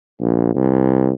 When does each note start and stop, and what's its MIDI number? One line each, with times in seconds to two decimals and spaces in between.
0.21 0.53 34
0.55 1.11 36